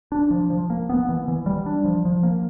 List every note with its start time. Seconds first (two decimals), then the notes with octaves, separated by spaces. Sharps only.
0.12 D4
0.30 F3
0.50 F3
0.70 A#3
0.89 B3
1.09 E3
1.28 E3
1.46 G3
1.66 D4
1.85 F3
2.05 F3
2.23 A#3